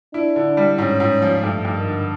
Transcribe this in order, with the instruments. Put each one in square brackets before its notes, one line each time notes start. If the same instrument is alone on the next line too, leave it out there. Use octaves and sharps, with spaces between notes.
[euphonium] D4 [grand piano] E4
[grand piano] D3
G3
[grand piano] G#2 [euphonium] C#4
[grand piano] G#2
F3
[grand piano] G2 [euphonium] A3
[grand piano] G2
[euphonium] D#3
[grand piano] D3